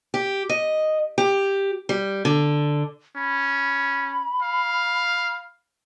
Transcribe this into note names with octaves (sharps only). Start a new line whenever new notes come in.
G4
D#5
G4
G3
D3
C#4 B5
F5